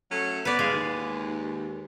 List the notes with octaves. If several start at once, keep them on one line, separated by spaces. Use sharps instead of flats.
F#3 A3 C#4
B3 B4 D5
E3 G#3 F5
D#2